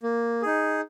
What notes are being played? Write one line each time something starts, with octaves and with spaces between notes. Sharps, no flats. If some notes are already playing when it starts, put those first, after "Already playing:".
A#3
D#4 G#4